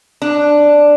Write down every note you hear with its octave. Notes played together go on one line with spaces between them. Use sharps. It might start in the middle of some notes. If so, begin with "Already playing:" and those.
D4